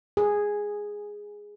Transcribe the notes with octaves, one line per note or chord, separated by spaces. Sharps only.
G#4